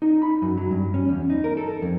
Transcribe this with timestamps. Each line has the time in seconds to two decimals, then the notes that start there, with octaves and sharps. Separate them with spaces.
0.02 D#4
0.22 B5
0.42 F#2
0.58 F#3
0.71 G2
0.94 C#4
1.09 E2
1.30 D#4
1.44 A#4
1.57 A4
1.82 F2